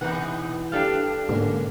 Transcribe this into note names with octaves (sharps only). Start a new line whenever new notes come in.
B2 E3 B3 D#4 B4 F#5
G2 D4 G4 A4 F5
G#2 D3 A#3 C#4